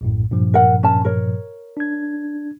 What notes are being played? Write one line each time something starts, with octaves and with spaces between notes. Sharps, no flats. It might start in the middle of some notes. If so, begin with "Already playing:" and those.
A#1 F#2 A2
G2 A#2 F3
A#4 F#5
C#4 A#4 A5
A#4 C#5
D4 G#6